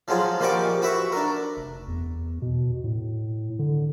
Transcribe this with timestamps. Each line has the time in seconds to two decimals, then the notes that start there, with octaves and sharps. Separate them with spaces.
0.08 F3 F#3 G#3 F4
0.40 A#2 F3 G3 D#5 C#6 D6
0.82 F#4 B4 E5 C#6
1.12 D4 A#4
1.57 F1
1.88 E2
2.42 B2
2.84 A2
3.59 D3